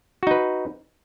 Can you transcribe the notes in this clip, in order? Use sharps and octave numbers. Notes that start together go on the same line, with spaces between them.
D#4 F#4 B4